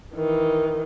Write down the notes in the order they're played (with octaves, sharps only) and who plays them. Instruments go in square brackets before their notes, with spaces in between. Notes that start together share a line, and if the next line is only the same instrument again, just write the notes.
[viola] D#3 E3